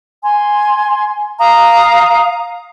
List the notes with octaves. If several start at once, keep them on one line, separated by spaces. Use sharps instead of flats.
G#5 C6
F5 A#5 D#6